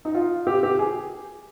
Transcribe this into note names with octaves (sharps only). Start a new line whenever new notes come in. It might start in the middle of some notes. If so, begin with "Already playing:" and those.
D#4
F4
G4
G4
G#4